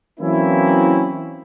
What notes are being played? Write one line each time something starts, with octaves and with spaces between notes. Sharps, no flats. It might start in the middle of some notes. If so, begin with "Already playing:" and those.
E3 F#3 A#3 C4 C#4 E4